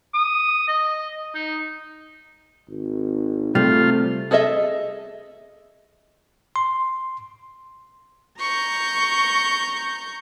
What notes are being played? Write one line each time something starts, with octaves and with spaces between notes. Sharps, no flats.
D#6
D#5
D#4
G#1
C3 G3 A3 F4
G#4 A4 C#5 D#5 E5
C6
A#5 C#6 G6